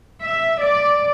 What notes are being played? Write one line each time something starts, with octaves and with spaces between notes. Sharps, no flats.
E5
D5